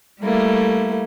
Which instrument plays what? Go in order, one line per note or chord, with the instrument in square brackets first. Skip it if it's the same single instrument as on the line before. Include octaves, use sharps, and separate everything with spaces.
[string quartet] G3 A3 A#3 E4